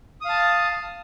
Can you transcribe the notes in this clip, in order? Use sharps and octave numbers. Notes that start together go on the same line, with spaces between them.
F5 A5 D#6